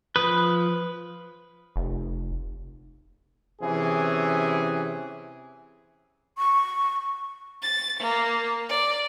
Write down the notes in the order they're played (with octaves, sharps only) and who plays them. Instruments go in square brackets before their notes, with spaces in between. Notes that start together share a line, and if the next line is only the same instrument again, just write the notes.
[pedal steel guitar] F3 D#6 F#6 [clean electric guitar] B4
[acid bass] F1
[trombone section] C3 E3 C#4 G#4
[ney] C#6
[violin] A6
A#3
D5